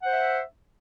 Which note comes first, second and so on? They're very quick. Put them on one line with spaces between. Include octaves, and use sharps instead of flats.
F#5 C5 E5